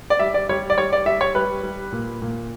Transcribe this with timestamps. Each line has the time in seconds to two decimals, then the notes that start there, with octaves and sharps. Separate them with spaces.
0.10 D5
0.19 G3 E5
0.34 D5
0.49 G3 C#5
0.70 D5
0.77 G3 C#5
0.93 D5
1.06 G3 E5
1.21 C#5
1.35 G3 B4
1.63 G3
1.92 A#2
2.22 A#2